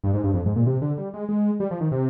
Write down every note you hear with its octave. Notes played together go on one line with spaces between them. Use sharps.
G2
G#2
G2
F2
G#2
A#2
C3
D3
G3
G#3
G#3
G3
F3
D#3
C3